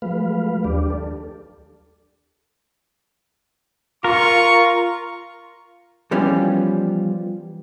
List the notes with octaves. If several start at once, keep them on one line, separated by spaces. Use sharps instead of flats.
F3 F#3 G#3 A3 B4 F5
D#2 D4 G4 D5
A4
F4 A#4 C#6
E3 F3 G3 B3 C#4 F4